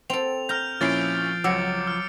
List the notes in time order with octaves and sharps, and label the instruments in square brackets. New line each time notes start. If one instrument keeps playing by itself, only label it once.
[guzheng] C4 A4 [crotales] F7
[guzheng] A#5 [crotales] F6 G6
[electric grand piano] A#2 C#4 E4 [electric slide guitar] F3 [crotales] A6 C7 D7
[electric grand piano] C#2 E6 [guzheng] F#3 [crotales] D6 C#7
[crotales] F6